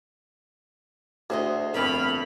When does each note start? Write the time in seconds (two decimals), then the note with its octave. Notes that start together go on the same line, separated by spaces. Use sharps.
1.30 D2 F#4 G#4 C5 D#5 C6
1.74 G1 F2 A#4 B4 G5 B5 F6